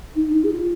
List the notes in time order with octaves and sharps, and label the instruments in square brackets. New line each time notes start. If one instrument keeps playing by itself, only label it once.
[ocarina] D#4
D#4
G#4
F4